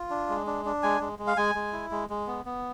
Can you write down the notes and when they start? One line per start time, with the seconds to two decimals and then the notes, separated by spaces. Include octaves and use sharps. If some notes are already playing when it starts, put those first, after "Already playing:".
Already playing: F4
0.10 D4
0.29 G#3
0.47 D4
0.65 D4
0.83 G#3 G#5
1.01 G#3
1.19 G#3
1.27 F5
1.37 G#3 G#5
1.55 G#3
1.73 E4
1.91 G#3
2.10 G#3
2.27 B3
2.46 B3